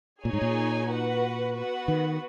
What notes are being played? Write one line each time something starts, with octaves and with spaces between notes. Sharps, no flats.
A#2 D#4 G#4 C#5 G#5
G#2
A#2
F#4 B4 F#5
B3 F#4 B4 F#5
D#3